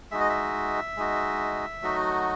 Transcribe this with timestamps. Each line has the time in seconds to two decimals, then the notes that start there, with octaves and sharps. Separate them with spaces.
0.11 G#3 D#4 F#4 E5
0.20 D#5
0.29 E5
0.97 G#3 D#4 F#4
1.82 F#3 A3 D#4 F#4